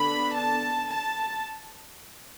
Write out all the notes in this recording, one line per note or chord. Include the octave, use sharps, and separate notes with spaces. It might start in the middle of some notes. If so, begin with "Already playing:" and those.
Already playing: D3 B3 D4 B5
A5
A5